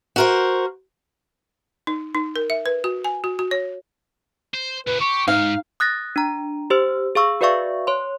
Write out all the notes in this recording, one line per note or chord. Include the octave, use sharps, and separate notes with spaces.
F#4 A#4 C5
D#4
D#4
A#4
E5
B4
F#4
G#5
F#4
F#4
C#5
C5
C#2 A#2 B4
G4 C#6
G#2 D#4 F5
D#6 F#6 A6 A#6
D4 A#5
G4 C5 E6
G#4 F5 C#6 E6
F#4 B4 D5 E5 F5 C#6
C#5 C6